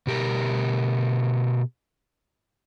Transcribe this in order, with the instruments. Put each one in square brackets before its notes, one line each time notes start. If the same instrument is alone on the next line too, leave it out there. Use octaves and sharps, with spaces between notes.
[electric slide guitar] B2 G4 A#4